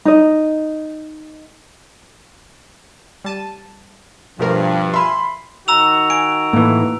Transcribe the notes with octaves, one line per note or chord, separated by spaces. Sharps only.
D#4 D#5
G3 A5 D#7
G2 B2 F3 A3 A#4
E5 F5 G#5 B5 C6
D#3 F#4 A#5 E6 F7
G#5 D7
A2 E3 A#3